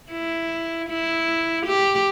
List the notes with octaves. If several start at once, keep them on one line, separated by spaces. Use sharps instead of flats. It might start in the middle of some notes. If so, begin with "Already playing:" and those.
E4
E4
G4